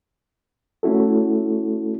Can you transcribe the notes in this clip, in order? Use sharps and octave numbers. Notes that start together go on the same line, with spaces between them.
A3 C#4 E4 F#4 A4